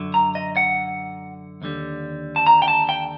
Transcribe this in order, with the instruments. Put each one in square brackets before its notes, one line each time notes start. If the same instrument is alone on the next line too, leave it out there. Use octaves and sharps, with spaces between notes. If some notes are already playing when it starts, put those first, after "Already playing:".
Already playing: [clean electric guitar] F#2 D3 F#3
A#5
D#5
F#5
D#2 D3 G3
A5
A#5
G5
A5
G5